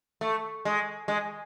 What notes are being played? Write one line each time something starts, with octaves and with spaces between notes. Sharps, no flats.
A3
G#3
G#3